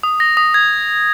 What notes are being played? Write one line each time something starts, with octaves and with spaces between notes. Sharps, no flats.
D#6
A#6
D#6
G#6